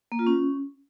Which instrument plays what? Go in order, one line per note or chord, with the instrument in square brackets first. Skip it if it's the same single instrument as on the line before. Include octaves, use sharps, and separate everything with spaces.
[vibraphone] A#3
F4
C#4